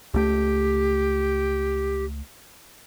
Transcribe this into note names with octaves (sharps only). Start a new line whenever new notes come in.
C#2 A3 G4